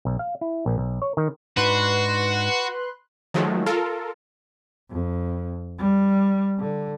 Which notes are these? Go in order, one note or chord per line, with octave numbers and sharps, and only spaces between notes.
B1
F5
E4
A#1
B1
C#5
D#3
G#2 D4 D#4 F#4 B4 C6 F#6
D#3 F3 F#3 G#3 A3
F4 A4 A#4
F2
G3
D3